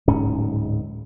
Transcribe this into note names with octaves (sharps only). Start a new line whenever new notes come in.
D1 G#2 C#4